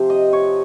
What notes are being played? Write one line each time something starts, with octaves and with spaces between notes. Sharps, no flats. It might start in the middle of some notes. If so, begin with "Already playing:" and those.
Already playing: C3 F3
D#5
C#5